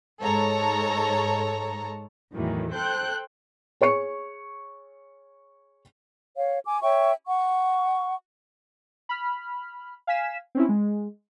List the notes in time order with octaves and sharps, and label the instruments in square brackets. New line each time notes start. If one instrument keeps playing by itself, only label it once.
[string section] G#2 G#3 A4 C#5 A5 A#5
E2 A2 D#3 E3 F#3
A4 C5 G5 F#6 G6
[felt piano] G#4 C#5 C#6 C#7
[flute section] C#5 F5
G#5 D6
C#5 E5 G5 C#6
F#5 C#6
[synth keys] B5 F6
F5 G#5 B6 E7
C4 C#4 E4
G#3